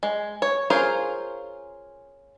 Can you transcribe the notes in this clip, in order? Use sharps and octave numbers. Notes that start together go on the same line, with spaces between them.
G#3
C#5
C#4 F4 G#4 A#4 C5